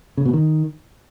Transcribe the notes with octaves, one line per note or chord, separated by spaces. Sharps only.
C#3
B2
D#3